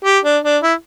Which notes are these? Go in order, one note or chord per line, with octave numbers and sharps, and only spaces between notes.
G4
D4
D4
E4